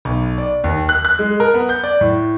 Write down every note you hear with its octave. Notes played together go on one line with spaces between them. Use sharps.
B1
D5
D#2
F#6
F#6
G#3
A#4
B3
G6
D5
A2